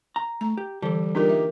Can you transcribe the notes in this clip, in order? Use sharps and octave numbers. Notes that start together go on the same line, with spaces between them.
A#5
A3 A#5
G4
D3 E3 G3 A4
A#3 D4 D#4 F4 G4 A#4
E5